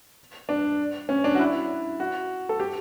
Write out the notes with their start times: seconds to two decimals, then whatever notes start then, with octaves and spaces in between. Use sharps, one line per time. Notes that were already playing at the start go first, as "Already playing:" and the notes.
0.49 D4
1.09 C#4
1.24 D4
1.35 F#4
1.39 E4
2.00 F#4
2.49 A4
2.60 G4